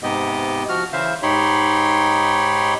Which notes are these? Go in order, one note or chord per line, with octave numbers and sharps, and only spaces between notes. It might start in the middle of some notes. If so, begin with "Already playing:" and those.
G#2 C3 B3 G4 D#5
F3 F#4 F6
C#3 E3 C5 E5 F5
G#2 D#4 G4 C#5 B5 C6